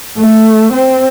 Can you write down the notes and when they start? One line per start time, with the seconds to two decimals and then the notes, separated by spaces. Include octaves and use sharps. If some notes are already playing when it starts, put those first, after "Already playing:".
0.15 A3
0.73 C4